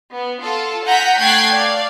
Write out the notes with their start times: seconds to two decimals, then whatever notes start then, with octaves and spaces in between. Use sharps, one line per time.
0.12 B3
0.42 F4 A4
0.86 F#5 G#5 A#5 G6 B6
1.19 A3 G5 F#6 G#6 A6 C7
1.53 D5 F5